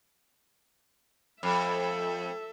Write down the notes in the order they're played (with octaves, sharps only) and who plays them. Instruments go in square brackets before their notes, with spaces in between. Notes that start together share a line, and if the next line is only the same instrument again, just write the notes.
[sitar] F2 [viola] A4 E5